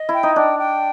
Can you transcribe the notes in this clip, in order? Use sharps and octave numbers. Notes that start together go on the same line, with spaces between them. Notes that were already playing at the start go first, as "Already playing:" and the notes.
Already playing: D#5
E4
G5
D#4
D4 G5
G5